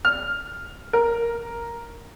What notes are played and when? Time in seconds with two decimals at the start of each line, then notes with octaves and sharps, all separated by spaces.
0.05 F6
0.93 A#4